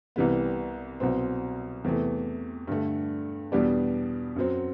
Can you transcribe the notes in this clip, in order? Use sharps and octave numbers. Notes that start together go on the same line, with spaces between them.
C2 C3 E3 G3 B3
C2 B2 F#3 C4
E2 C3 E3 A3
G2 D3 A3
E2 B2 G3 B3 D4
F#2 F#3 C4